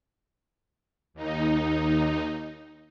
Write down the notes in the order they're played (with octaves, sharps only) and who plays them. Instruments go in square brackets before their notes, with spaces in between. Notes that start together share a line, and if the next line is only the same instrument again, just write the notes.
[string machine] D#2 D#4